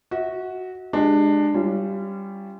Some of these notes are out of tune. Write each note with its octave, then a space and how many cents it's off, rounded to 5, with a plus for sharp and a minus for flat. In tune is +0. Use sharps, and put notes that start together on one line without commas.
F#4 +0 E5 -40
G#3 +0 D4 +20 G4 -10
G3 +0 C#4 +0 F4 -35